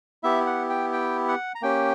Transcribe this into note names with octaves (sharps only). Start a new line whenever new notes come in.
B3 E4 G4 E5
F#5
G5
G5
F#5
A#5
A#3 C#4 G4 G5